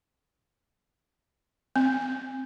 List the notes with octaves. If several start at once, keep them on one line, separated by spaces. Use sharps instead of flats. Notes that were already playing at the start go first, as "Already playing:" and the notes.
C4